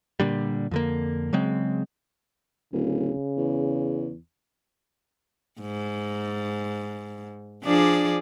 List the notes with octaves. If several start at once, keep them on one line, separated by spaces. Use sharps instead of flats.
A#2 D3 G3
F2 D3 A#3
C#3 F#3 G#3 C4
D1 C#3
E2
G#2
F3 D4 G#4 D5